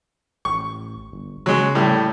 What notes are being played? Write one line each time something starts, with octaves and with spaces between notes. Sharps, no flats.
A1 C#6
G1
C#3 F#3 G#3
A2 G3 A3